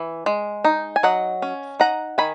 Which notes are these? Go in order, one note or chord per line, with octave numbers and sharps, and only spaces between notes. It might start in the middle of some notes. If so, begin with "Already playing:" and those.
Already playing: E3
G#3
D#4
G#5
F#3 D#5 F#5
C#4
D#4 F#5 A#5
D#3 G#5 B5